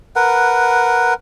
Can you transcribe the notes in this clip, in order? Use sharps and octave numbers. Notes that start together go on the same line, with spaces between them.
A#4 B4 F#5